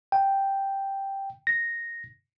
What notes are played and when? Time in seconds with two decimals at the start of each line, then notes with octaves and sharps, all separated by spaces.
0.12 G5
1.47 A#6